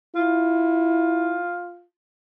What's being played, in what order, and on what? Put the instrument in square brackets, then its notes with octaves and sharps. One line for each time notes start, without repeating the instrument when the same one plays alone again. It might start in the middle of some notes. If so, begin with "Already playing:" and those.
[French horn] E4 [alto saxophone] F4